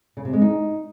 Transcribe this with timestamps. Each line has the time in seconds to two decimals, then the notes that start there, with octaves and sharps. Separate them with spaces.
0.17 C#3
0.25 C3
0.33 G#3
0.42 D#4